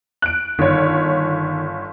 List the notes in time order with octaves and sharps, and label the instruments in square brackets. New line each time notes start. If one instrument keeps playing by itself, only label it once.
[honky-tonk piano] F#6 D7
[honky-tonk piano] G1 C#5 [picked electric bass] D#3